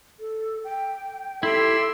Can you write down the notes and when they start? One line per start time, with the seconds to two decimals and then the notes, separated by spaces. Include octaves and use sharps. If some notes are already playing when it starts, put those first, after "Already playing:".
0.20 A4
0.64 G5
1.43 E4 G4 A4 E5 C6 E6